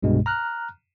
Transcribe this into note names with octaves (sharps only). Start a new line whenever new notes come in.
C2 G2 B2 G#3
A#5 F6 F#6